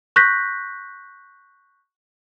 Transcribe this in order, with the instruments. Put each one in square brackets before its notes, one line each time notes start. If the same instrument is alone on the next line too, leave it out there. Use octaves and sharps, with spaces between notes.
[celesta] C#6 F#6 G6 A#6 B6